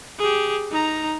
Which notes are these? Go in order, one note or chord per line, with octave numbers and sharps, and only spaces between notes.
G4 G#4
D#4 A#5